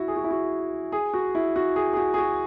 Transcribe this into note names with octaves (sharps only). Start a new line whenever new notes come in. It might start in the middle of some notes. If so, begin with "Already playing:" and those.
Already playing: E4 F#4
G#4
F#4
E4
F#4
G#4
F#4
E4
F#4
G#4
G#4
F#4
G#4
F#4